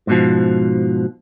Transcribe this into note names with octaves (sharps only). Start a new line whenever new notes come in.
G#2 B2 F3